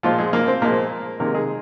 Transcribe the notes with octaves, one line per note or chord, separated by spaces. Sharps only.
A#2 F3 G#3 F4
G#3 G#4
A#3 A#4
C4 C5
A#2 F3 G#3 A#3 A#4
C3 D#3 G#3 A#3 A#4
G#3 G#4